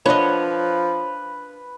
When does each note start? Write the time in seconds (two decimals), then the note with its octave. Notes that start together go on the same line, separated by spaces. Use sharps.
0.06 F3 D4 B4 C#5 D#5 F#5